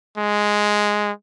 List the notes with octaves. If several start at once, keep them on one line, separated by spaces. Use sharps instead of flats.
G#3